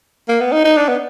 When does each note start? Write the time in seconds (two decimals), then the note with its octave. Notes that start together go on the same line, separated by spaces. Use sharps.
0.28 A#3
0.40 B3
0.52 D#4
0.65 D#4
0.77 D4
0.89 B3